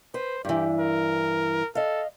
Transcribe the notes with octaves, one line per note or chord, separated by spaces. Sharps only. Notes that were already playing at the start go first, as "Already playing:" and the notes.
B4 C5
G2 E3 G4
A#4
A4 D#5 F5